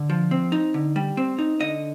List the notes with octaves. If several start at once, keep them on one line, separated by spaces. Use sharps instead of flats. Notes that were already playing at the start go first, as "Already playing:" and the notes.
Already playing: D3
F3
C4
D#4
D3
G3
C4
D#4
D3 D#5